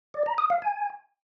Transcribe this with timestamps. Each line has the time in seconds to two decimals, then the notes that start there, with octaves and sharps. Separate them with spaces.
0.14 D5
0.26 A#5
0.38 D#6
0.50 F5
0.62 G#5